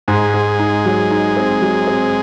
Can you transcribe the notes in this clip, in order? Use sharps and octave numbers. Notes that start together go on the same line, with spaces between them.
G#2 G#3
G#2
D#4
F#3
D#4
C4
F#3
C4